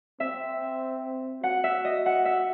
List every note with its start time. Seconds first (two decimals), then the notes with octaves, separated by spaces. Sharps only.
0.20 C4 E5
1.43 F#4 F#5
1.64 E5
1.85 D#5
2.06 F#5
2.25 E5